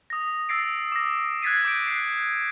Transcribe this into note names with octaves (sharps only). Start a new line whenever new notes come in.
D#6 A#6
E6 A6 A#6 C7 D7
D6 A#6
F#6 G#6 A6 B6 C7 D#7
D6 G6 D7
F#6 C7